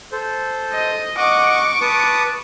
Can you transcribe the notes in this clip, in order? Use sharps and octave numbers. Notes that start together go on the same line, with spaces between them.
A4 C5
D#5
D#5 F#5 C#6 D6
B4 A5 D#6